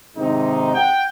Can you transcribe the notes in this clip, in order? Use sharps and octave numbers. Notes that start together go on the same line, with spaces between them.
G#2 C3 D#3 D#4
F#5 G5